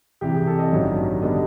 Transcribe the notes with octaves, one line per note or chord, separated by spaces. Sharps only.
C2 C3 E3 G4
G#4
A4
D#5
A1 G2 D#3 F#3
D3 G3 B3 D#5